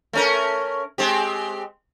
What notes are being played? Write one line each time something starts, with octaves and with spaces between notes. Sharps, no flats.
A3 C#4 A#4
G#3 C4 G4